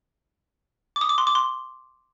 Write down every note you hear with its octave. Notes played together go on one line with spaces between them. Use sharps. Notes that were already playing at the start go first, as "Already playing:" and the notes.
D6
D#6
D6
C6
D6
C6